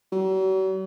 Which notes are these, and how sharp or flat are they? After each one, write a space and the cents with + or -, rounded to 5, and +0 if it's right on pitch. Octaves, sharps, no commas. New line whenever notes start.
F#3 +45